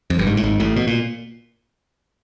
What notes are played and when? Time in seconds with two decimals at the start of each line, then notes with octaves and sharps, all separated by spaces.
0.10 F2
0.19 G1 G2
0.27 G#1 G#2
0.37 A2
0.43 G#1 G#2
0.60 A1 A2
0.76 B2
0.87 A#2